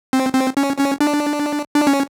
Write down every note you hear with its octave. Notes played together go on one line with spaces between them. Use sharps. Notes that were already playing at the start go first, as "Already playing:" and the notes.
C4
C4
C#4
C#4
D4
D4
C#4